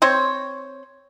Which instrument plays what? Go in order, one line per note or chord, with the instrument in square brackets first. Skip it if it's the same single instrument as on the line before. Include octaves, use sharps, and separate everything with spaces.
[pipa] C4 C5 C#5